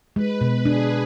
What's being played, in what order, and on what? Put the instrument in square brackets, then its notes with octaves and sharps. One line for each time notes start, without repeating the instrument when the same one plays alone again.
[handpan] G#3 [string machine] B4
[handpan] B2
[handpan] D4 [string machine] G#4